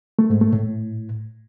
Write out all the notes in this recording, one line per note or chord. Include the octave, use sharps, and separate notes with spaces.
A3
G#2
A3
A2